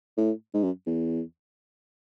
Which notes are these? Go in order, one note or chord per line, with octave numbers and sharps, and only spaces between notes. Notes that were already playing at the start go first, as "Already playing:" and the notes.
A2
G#2
F#2
E2